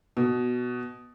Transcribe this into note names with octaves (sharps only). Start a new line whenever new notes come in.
B2